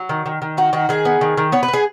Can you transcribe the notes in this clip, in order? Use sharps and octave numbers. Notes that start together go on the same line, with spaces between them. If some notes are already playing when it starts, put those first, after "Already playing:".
Already playing: F#3
D#3
D#3
D#3
D#4 F#4
D#3 F#4
D#3 G#4
B3
D#3
D#3
B3 C#5
B4
B3
G#4